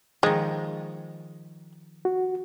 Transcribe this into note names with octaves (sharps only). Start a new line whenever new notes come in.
D#3 F3 G#3
F#4